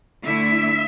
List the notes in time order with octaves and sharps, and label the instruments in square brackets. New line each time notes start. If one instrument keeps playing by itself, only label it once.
[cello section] D3 A3 E4 E5